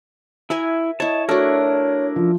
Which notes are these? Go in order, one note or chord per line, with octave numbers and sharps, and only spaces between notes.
E4 A#4 E5 G#5
E4 C#5 D#5 A5
A3 D4 E4 F#4 A#4 C#5
F3